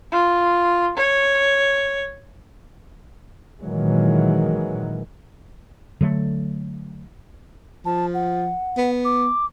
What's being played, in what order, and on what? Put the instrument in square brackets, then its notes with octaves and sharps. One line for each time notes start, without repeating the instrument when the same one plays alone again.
[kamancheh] F4
C#5
[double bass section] A#2 D#3 E3 F#3 G#3
[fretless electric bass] D3 F#3 A3
[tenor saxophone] F3 [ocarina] A5
[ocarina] F#5
[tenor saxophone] B3
[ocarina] D6